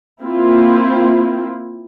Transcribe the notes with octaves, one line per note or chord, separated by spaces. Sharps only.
A#3 C4 E4 F4